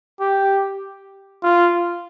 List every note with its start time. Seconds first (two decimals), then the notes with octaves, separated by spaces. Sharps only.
0.20 G4
1.43 F4